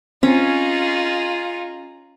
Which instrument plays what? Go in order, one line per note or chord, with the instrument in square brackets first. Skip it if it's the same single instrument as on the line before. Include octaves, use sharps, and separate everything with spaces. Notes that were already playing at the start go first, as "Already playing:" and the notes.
[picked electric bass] C4 [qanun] C#4 [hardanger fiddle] D#4 G#4 [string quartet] F4